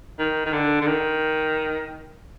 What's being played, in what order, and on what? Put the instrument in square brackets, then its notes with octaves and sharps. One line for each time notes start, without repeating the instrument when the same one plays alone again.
[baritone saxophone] D#3
D#3
D3
D3
D#3